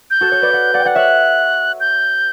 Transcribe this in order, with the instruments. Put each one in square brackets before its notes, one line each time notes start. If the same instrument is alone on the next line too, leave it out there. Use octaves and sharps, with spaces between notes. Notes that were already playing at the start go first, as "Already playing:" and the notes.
[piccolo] G6
[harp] F#4 A4
A4 C#5
B4 D5
D5 F#5
D5 F#5
G5
D5 F#5
[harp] C#5 E5 [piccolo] F#6
[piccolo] G6